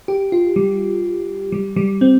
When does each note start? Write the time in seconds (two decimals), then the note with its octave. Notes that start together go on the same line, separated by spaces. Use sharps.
0.08 G4
0.32 F4
0.56 G3
1.52 G3
1.76 G3
2.01 C4